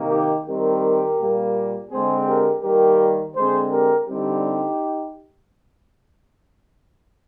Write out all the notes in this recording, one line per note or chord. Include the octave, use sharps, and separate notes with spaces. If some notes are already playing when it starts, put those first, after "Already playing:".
Already playing: C3 D#3 A#3
D#4 G4
D#3 G3 C4 G4 A#4
A#2 G3 A#3
D3 G#3 C4 G#4 C5
G4 A#4
D#3 G3 A#3 G4 A#4
D3 G#3 C4 G#4 C5
G4 A#4
D3 G3 C4 D#4 G4